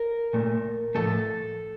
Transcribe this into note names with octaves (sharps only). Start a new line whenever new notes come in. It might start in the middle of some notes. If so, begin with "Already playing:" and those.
Already playing: A#4
A#2 A3
A2 F3 A3 A4